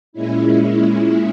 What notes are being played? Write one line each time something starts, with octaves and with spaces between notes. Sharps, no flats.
A#2 G#3 C#4 E4